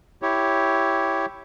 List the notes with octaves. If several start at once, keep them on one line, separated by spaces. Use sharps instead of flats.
E4 G4 C#5